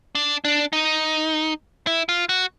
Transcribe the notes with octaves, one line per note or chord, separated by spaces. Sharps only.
D4
D4
D#4
E4
F4
F#4